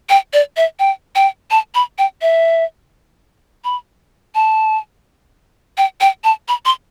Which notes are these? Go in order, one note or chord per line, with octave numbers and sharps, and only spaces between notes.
G5
D5
E5
G5
G5
A5
B5
G5
E5
B5
A5
G5
G5
A5
B5
C6